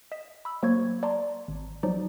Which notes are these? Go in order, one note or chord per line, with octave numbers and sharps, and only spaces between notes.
D#5 B6 E7
B5 E6
F#3 A#3 C5 C#6 G#6
D5 A5 A#5 C6
G#1
F3 F#3 D#4 D5